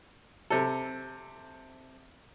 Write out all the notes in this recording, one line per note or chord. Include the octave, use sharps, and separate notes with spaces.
C3 A4